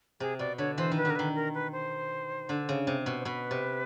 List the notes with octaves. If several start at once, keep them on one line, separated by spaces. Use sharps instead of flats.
C3 G#4
B2 D5
D3 C#5
E3 C5
D#3
B4
D3
A#4
D#3 B4
A#4
B4
C5
D3
C#3
C3
B2
C5
B2 B4
C3